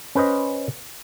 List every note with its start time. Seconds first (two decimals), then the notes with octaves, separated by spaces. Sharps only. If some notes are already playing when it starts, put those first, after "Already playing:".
0.15 C#4 B4 C5 D#5